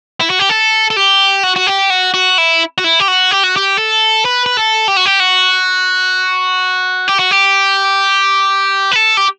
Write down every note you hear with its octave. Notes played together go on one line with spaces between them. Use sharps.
E4
F#4
G4
A4
A4
G4
F#4
F#4
G4
F#4
F#4
E4
F#4
E4
G4
F#4
G4
F#4
G4
A4
B4
B4
A4
G4
F#4
G4
F#4
G4
F#4
G4
B4
A4
G4